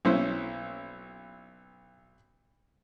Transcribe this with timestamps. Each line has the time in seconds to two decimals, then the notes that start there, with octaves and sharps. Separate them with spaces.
0.05 B1 C#4 E4 C5